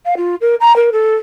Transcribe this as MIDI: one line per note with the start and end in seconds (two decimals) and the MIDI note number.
0.05 0.14 77
0.16 0.35 65
0.40 0.55 70
0.60 0.74 82
0.75 0.89 70
0.92 1.14 69